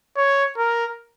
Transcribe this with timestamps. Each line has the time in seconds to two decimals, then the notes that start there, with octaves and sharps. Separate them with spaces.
0.16 C#5
0.57 A#4